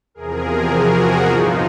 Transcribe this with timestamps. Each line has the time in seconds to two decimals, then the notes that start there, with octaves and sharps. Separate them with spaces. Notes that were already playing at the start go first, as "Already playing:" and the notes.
0.15 E2 C3 F3 G#4 A#4
0.71 F#4 G#4
1.28 G2 D3 F3 D#4 F4